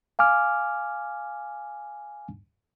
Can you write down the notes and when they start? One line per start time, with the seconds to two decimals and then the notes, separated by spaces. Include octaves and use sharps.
0.19 F5 G#5 D6 F6